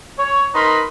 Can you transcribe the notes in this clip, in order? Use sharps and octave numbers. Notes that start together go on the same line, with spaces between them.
C#5
D#4 A#4 B4 B5 C6